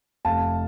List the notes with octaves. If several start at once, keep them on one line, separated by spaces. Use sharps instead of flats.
F1 F5 A5